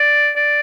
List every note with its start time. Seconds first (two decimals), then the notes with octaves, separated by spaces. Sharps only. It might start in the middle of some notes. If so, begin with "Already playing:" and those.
Already playing: D5
0.36 D5